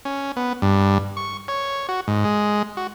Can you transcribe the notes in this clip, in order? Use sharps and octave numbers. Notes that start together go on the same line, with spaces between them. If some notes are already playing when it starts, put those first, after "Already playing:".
C#4
B3
G2
C#6
C#5
F#4
G#2
G#3
F#4